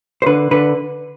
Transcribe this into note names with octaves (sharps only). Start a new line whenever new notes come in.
C5
D3 B4
D3 B4